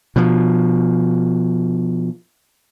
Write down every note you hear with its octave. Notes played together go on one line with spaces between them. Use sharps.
B2 F3